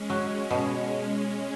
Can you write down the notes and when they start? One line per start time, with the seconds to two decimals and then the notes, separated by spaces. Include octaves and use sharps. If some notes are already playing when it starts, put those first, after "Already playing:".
Already playing: G#3 C#4
0.10 F#3
0.51 B2